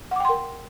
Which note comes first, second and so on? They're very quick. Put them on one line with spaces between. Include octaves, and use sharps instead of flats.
F#5 D6 G5 C6 A#4